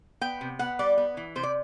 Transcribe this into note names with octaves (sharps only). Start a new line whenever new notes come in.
B3 G5
C3
B3 F#5
G3 D5
B3
E3
C3 C5
D5